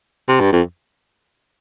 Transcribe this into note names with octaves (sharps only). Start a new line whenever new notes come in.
C3
G2
F2